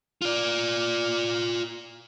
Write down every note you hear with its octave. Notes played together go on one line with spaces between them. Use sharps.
F4 D5